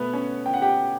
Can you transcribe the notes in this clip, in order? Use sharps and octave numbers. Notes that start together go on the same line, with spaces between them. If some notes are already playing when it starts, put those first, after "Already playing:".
Already playing: B2 A3 B3 B4
C#4 C#5
G5
F#5
G4 G5